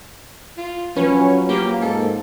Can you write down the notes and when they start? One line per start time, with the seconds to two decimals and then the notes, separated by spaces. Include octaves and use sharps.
0.57 F4
0.96 F3 F#3 C#4 B4 C#5
1.49 A#3 G4
1.82 G#2 A4